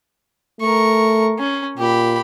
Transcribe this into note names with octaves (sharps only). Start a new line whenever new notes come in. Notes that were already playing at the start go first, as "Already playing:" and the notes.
A3 A#4 C#6
C#4
A#2 G4 B5